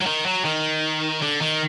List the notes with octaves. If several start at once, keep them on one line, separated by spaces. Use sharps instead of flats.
F#3
D#3
F#3
D#3
D3
D#3